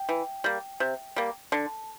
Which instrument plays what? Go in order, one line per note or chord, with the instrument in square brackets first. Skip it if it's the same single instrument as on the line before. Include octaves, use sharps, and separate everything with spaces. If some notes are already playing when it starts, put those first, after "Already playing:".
Already playing: [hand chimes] G5
[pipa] E3
G3 A#3
C3
G3 A#3
[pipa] D3 [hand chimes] A5